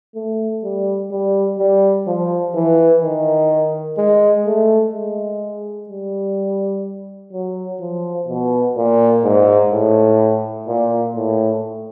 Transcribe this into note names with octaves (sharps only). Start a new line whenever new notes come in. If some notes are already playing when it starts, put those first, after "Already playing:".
A3
G3
G3
G3
F3
E3
D#3
G#3
A3
G#3
G3
F#3
F3
B2
A#2
G#2
A2
A#2
A2